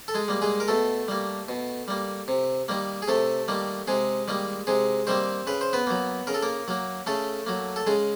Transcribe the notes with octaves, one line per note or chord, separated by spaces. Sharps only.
A4
G#3 G#4
G3 A#3
G#3 G#4
A#4
B2 A3 A4
G3 A#3
B2
G3 A#3
C3
D#3 G3 A#3
G#4
C3 A3 A4
D#3 G3 A#3
C3 G#3 G#4
D#3 G3 A#3
C3 G#3 G#4
D#3 G3 A#3 C4 C5
C#3 B4
C5
B3 B4
F#3 A#3
C#3 A#4
A4
A#3 A#4
F#3 A#3
C#3 A3 A4
F#3 A#3
A4
C#3 G#3 G#4